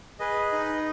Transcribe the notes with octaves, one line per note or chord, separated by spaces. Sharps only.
G#4 B4 D#5
D#4